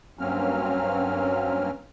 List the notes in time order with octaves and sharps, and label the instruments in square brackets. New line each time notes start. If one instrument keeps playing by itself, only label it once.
[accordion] G2 F#3 A#3 C4 C#4 F6